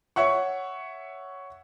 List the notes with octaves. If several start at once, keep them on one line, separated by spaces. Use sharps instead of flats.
C#5 E5 F#5 C#6